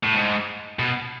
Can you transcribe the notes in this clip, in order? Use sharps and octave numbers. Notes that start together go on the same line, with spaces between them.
A2
G#2
B2